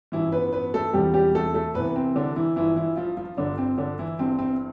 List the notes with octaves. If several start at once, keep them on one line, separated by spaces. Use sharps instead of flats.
A1 G2 E3 F3 E4
B3 B4
B3 B4
A3 A4
E1 E2 C3 F3 G3 G4
G3 G4
A3 A4
A3 A4
C2 C3 E3 B3 B4
C4
D3 D4
E3 E4
G1 G2 E3 F3 E4
E3 E4
F3 F4
F3 F4
G1 G2 D3 F3 D4
C4
D3 D4
E3 E4
G1 G2 E3 C4
C4